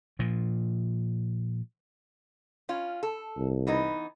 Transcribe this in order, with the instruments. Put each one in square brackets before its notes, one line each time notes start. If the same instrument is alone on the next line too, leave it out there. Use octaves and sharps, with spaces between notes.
[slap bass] A#2 F3
[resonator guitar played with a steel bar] C#4 F4
A4
[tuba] C2
[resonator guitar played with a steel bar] E3 B3 D#4